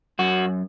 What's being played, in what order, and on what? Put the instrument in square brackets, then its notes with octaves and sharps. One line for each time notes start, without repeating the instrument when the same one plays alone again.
[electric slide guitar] F#2 F#4